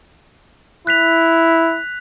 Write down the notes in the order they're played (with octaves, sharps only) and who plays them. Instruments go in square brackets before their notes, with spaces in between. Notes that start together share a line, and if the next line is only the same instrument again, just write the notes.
[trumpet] E4 [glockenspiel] F#6 B6 F7